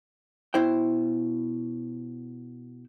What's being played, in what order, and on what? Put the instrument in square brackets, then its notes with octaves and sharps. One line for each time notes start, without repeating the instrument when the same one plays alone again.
[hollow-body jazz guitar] B2 E4 C5 G5